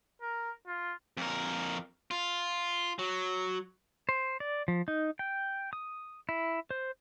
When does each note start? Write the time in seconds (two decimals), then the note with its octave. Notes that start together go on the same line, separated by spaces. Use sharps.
0.21 A#4
0.67 F4
1.17 F2 A#4
2.11 F4
2.99 F#3
4.09 C5
4.40 D5
4.68 F3
4.88 D#4
5.19 G5
5.73 D#6
6.29 E4
6.71 C5